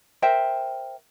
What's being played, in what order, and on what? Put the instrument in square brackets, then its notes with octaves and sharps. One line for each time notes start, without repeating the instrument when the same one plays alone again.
[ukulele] A#4 C5 E5 G5